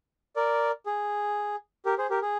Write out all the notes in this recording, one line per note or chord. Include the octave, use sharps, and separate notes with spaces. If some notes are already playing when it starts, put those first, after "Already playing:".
A#4 D5
G#4
G4 A#4
G#4 C5
G4 A#4
G#4